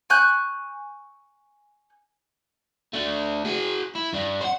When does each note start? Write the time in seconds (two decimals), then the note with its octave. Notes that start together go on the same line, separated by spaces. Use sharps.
0.10 G#5 C#6 F#6 G6
2.94 A3 D4
3.45 F#4 G#4
3.95 E4
4.13 G2 D4
4.41 C5 F#5